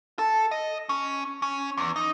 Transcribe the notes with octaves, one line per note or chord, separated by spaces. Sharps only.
A4
D#5
C#4
C#4
E2
D#4